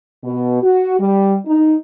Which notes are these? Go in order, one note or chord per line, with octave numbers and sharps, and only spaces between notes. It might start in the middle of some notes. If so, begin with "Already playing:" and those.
B2
F#4
G3
D#4